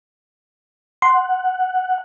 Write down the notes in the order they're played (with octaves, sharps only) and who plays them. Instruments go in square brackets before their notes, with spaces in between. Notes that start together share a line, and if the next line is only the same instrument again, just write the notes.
[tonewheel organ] F#5 [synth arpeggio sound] C6